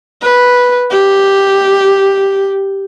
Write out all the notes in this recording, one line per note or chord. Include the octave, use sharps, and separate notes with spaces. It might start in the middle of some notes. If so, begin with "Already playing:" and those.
B4
G4